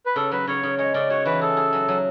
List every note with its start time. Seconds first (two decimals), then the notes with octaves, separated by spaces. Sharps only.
0.06 B4
0.16 C#3 A4
0.31 F#3 B4
0.47 C#3 C#5
0.63 C#3
0.78 G#3 C#5
0.94 C#3 D5
1.10 F#4 C#5
1.25 E3 B4
1.41 G#4 A4
1.57 G#4
1.73 F#3
1.88 F#3